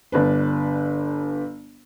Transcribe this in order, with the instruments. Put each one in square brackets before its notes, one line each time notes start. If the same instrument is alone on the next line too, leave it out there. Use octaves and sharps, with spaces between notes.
[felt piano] G1 D4 B4